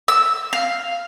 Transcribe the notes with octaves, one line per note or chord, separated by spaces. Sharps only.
E6
F5